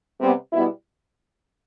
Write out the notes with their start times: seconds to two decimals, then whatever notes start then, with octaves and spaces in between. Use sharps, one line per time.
0.19 C3 G3 B3
0.53 B2 G3 B3 E4